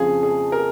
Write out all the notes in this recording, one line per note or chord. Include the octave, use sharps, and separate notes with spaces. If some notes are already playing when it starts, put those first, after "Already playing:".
Already playing: F2 C#3 F3 G#4
G#4
A#4